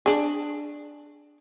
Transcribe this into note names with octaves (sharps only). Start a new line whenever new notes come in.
D4 G#4